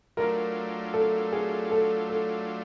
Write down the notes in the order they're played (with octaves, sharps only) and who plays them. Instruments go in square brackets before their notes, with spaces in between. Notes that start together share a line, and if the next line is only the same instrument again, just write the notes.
[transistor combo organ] F#3 A3 D4 F4 [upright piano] A#4
[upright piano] A4
G#4
A4
A4